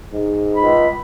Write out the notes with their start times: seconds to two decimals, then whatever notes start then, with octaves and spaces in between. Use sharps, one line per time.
0.13 G#2
0.56 C#2 B5